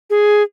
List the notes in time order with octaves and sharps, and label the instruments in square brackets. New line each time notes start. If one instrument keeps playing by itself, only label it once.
[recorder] G#4